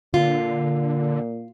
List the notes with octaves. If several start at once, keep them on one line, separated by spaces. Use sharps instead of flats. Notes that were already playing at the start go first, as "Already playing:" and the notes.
A#2 D3 F4